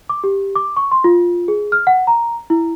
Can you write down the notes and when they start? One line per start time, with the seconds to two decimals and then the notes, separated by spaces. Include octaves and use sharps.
0.09 D6
0.24 G4
0.56 D6
0.77 C#6
0.91 C6
1.04 F4
1.48 G#4
1.72 F6
1.87 F#5
2.07 A#5
2.50 E4